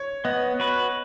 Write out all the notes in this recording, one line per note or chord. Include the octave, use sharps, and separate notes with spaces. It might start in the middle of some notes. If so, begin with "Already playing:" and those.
Already playing: C#5
B3 D#5
F#4 B4